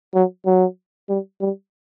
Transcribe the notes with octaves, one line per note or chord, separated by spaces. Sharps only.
F#3
F#3
G3
G3